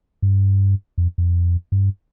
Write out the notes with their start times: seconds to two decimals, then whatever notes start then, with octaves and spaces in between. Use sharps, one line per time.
0.22 G2
0.98 F2
1.18 F2
1.72 G2